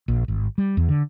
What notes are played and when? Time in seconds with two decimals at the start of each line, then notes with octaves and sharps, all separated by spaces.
0.08 A#1
0.28 G#1
0.58 G3
0.77 E2
0.89 D3